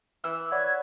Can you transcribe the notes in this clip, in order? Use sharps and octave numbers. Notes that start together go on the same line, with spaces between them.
E3 E6
B4 C#5 D5 F#5 G#6